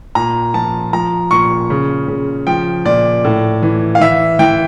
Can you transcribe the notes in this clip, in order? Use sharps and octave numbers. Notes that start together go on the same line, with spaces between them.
A#2 A#5
F3 A5
F3 A#5
A#2 C#6
C#3
C#3
F3 G5
A#2 D5
A2
E3
F5
E3 E5
E3 G5